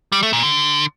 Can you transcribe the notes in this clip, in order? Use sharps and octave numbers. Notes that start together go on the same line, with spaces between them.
G3
A3
A#2
D3